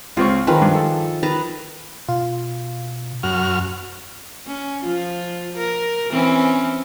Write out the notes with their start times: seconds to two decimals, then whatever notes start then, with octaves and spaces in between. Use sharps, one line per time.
0.17 C#2 C4 F4 C#6
0.47 D#3 F3 G#4 A#4 B4
0.62 G2
0.75 A4
1.23 D#3 B4 A5 A#5
2.08 B2 F4
3.23 F#2 F#4 F6
4.46 C#4
4.83 F3 F4
5.57 A#4
6.12 E3 C4 C#4